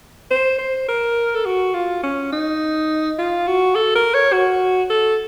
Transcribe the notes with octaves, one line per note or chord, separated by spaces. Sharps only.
C5
C5
A#4
A4
F#4
F4
C#4
D#4
F4
F#4
A4
A#4
C#5
F#4
A4